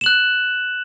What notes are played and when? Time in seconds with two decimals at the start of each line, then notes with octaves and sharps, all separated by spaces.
0.01 E7
0.04 F#7
0.06 F#6